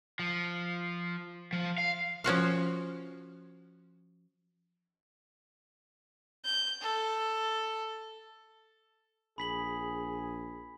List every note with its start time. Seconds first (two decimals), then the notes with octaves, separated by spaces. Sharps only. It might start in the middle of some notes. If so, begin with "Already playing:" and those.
0.19 F3
1.53 F3
1.78 F5
2.24 F3 C#4 F#4 F5
6.45 G6
6.81 A4
9.38 A#1 G#4 B5 B6 F#7